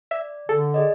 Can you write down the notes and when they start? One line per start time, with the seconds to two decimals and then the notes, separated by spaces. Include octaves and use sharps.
0.11 D5 E5
0.49 D3 A4
0.74 G#4 D5 D#5